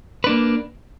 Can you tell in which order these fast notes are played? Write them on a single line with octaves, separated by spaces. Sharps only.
B4 D4 A#3